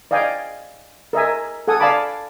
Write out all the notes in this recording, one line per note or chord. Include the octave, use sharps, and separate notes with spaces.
D5 D#5 F5 G5 G#5
A#4 D#5 E5 G#5
A4 F#5 G#5 D#6
D5 F5 G#5 A5 B5 D6